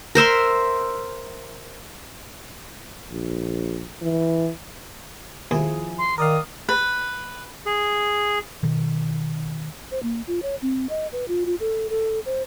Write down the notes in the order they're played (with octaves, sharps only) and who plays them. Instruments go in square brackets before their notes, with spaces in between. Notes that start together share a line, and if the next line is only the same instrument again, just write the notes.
[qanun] A#4 C5 E5 C6
[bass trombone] A#1
E3
[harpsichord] D#2 [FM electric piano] F3 E4 G#4
[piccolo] C6
[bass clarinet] D#3 [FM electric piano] A#4 D5 F5 [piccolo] D#6
[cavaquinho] B4
[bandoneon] G#4
[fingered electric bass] B2 D#3
[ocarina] C5
A#3
F4
C#5
C4
D#5
B4
F4
F4
A4
A4
C5